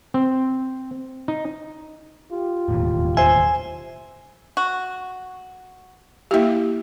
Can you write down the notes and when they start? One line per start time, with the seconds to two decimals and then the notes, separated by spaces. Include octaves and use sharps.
0.14 C4
1.28 D#4
2.32 F4 G4
2.69 E1 D#2 A2
3.17 C5 E5 G#5
4.57 F#4
6.31 A#3 E4 G4 E5 F5